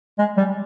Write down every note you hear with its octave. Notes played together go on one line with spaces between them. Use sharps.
G#3
G3